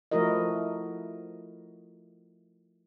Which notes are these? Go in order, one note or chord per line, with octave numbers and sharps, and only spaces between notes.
F3 A3 E4 F#4 A#4 D#5